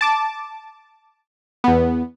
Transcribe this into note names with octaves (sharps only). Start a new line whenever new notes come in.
A5 D6 A6
E2 B3